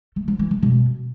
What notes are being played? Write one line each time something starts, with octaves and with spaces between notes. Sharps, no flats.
A3
F3
E3
A3
B2